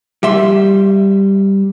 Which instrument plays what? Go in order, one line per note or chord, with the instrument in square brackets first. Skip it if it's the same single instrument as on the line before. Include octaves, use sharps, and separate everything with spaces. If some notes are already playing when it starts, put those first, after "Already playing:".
[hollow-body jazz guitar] G3 E5 C6